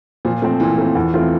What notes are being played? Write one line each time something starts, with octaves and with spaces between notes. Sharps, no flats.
A#2 F3
F3 A3 C4
A#2 E3
A3 C4
E2
E3 A3 C4 F4